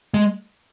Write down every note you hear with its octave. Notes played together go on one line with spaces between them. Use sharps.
G#3